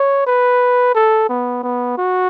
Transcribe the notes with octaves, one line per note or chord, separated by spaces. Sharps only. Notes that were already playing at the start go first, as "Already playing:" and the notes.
Already playing: C#5
B4
A4
B3
B3
F#4